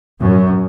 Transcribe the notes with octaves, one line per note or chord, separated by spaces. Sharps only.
F#2